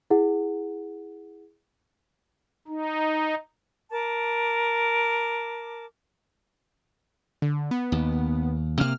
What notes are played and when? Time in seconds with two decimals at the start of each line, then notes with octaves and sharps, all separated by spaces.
0.10 E4 G#4 F#5
2.68 D#4
3.91 A#4 A5 D6
7.42 D3
7.71 B3
7.92 D#2
8.80 C3 A#3 F6